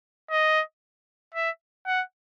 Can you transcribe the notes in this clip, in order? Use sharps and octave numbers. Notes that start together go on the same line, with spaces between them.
D#5
E5
F#5